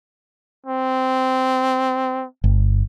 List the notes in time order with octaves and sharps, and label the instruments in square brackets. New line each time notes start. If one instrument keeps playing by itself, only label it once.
[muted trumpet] C4
[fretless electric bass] G1